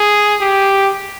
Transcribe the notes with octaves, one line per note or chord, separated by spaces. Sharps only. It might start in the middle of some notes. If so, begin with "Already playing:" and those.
Already playing: G#4
G4